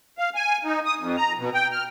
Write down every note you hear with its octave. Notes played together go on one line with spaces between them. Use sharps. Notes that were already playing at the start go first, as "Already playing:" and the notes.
F5
G#5
D#4
D#6
F2
A#5
B2
G5
F6